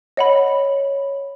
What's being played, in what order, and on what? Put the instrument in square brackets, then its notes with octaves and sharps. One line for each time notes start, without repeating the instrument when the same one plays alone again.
[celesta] C#5 [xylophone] D#5 F#5 B5